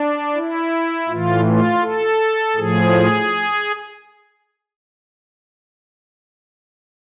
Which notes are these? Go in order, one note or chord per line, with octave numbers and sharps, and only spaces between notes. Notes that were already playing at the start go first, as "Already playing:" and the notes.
Already playing: D4
E4
A2 E3 F4
F4
A4
A2 F3 G#4